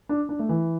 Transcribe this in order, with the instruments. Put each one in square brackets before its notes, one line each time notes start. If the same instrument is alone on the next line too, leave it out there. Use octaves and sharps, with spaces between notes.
[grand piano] D4
D4
A3
E3